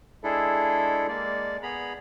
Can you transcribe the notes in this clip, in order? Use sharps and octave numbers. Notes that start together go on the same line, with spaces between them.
G#3 D4 E4 G#4 A4
G#3 A#3 D5
B3 G#4 A#5 B5